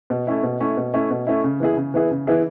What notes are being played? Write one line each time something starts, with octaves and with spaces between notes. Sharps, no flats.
B2
A3 C#4 E4
B2
A3 C#4 E4
B2
A3 C#4 E4
B2
A3 C#4 E4
C#3
E3 B3 E4 G#4
C#3
E3 B3 E4 G#4
C#3
E3 B3 E4 G#4